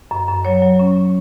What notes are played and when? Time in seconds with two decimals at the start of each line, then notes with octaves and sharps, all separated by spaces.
0.11 F#2
0.29 F#2
0.45 F#3 C#5
0.62 F#3
0.79 C#4